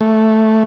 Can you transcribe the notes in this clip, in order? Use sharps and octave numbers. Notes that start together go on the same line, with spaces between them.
A3